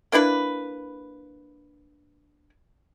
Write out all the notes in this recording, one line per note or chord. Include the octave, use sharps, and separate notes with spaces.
A#3 D4 E4 B4